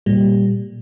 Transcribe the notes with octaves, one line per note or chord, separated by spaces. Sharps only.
A#2 G3